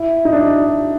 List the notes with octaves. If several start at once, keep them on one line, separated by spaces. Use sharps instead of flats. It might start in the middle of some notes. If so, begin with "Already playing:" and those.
Already playing: E4
D#4
D4